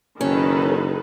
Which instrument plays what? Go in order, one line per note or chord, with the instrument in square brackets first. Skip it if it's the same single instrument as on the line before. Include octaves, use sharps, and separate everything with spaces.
[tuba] F#1 [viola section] D#3 A4 B4 [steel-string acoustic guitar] C#4